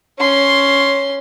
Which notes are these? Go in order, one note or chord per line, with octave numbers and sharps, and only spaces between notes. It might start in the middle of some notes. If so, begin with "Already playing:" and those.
C#4 C6